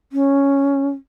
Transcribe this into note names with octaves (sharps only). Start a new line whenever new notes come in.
C#4